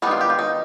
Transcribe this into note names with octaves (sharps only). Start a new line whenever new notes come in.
D#3 G3 B3 D4 D#4
F4
G4
F4
D#4